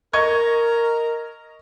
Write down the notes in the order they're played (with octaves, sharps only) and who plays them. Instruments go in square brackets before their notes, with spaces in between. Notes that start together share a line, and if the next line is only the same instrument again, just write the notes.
[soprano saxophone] A#4 [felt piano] D#5 C#6 G#6